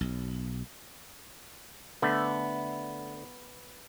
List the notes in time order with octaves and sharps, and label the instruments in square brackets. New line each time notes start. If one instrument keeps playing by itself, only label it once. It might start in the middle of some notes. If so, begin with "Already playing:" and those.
[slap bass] B1
[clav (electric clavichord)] D3 A3 [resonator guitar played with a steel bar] B3